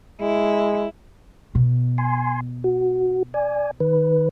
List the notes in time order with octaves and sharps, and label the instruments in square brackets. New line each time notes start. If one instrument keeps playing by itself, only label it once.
[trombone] G#3 [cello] E4
[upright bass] B2
[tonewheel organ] G#5 C6
F#4
D5 G#5
D#3 B4